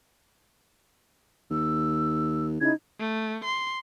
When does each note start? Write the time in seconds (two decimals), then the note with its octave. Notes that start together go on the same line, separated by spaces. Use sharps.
1.51 D#2 E6
2.61 C#3 D#4 E4 G#6
3.00 A3
3.44 C6